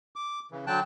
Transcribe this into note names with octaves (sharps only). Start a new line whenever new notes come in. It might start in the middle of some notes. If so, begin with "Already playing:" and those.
D6
C#3 E3
D3 F#3 G5 A5 F#6